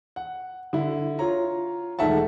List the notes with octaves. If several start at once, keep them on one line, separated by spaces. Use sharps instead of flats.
F#5
D3 E4
F4 C#5 A#5
E1 D#3 A3 E5 F#5 A5